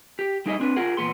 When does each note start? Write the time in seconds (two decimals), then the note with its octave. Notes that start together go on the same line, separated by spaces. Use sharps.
0.19 G4
0.46 G3 D#4 E4 G#4 D5 D#5
0.60 C4 D4 B4
0.76 F4 G#4 A#4 F#5
0.97 E2 A#2 B3 C6